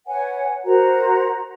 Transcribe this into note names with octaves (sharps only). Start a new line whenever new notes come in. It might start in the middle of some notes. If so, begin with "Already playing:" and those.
B4 C#5 F#5 G#5
F#4 A#4 C5 A#5